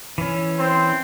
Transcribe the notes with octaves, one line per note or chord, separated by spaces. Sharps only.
E3 C#4
C4 C5